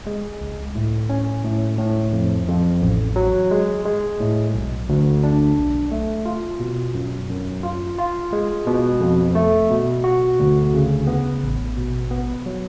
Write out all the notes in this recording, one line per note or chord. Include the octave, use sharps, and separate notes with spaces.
G#3
C#2
A2
C#4
A2
A2
F2
F2
A1
F#3
G#3
G#3
A2
B1
D2
D4
B1
A3
F4
B2
F#2
F#2
F4
F4
G#3
B2
F2
A3
B2
F#4
D2
C#3
B3
A1
B2
B3
F#3